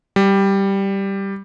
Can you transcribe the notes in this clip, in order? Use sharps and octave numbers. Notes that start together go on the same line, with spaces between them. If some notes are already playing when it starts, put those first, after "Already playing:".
G3